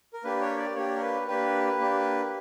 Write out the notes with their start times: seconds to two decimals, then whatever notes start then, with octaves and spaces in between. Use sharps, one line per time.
0.13 A#4
0.24 A#3 D4 G4 B4
0.41 C#5
0.58 D5
0.75 A#3 D4 G4 C#5
0.96 A#4
1.01 B4
1.28 A#3 D4 G4 B4
1.79 A#3 D4 G4